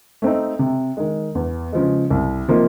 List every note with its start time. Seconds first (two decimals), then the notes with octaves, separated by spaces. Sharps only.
0.22 A3 C4 D#4
0.59 C3
0.97 D#3 G#3
1.35 E2
1.73 C#3 F3 G#3
2.10 C2
2.48 C3 F3 A#3 D#4